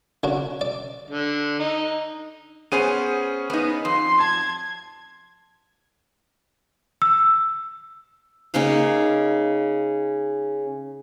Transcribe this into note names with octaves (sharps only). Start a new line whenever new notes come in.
C#3 D4 F#4
D5
D3
D#4
B3 C#4 G#4 C5 G#5 D#7
B3 D#4 B4
F2 C6
A5 G#6
E6
C#3 A#3 D#4 F5